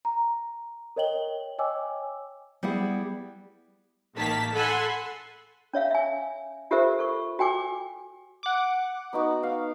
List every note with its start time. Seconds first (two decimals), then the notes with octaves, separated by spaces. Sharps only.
0.05 A#5
0.96 A#4 C#5 D#5 G5 F#7 G7
1.59 C#5 D#5 G5 G#5 D6 E6
2.63 G3 B3 E4 G#4 F#5
4.15 A1 D#3 A#3 A5 B6
4.53 A4 F#5 G#5 B5 C6
5.73 C#4 C#5 E5 F5
5.91 E5 G#5
6.71 F4 G4 A4 A#4 C5 E5
6.99 A4 C#6
7.39 F#4 G5 G#5 D6
8.43 F#5 D6
9.13 B3 D#4 F#4
9.43 F5